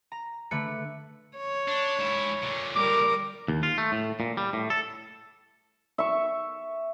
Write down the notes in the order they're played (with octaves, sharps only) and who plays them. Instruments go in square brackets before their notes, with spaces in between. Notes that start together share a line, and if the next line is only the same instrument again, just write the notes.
[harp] A#5
D3 A3 B4 C#7
[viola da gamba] C#5
[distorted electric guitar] D4
G#2 E4
A#2 D3
[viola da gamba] G3 A#4 [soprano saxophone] D6
[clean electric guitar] D#2
F4
A3
A2
A#2
G3
A2
A4
[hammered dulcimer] E5 C#6